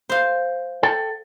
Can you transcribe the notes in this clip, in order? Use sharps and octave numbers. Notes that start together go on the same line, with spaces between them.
C5 F5
A4 G5